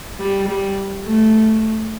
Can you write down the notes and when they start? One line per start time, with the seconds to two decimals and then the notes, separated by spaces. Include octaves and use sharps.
0.20 G3
0.48 G3
1.04 A3